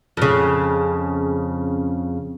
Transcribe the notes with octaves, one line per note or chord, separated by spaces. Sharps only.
F2 C#3